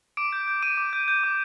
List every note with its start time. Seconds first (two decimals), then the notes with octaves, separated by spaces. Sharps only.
0.17 D6 D7
0.32 G6
0.48 G6
0.63 D6 D#7
0.78 D6
0.93 G6
1.08 G6
1.23 D6